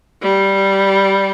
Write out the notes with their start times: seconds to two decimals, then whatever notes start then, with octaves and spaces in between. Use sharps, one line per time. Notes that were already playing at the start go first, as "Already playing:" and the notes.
0.22 G3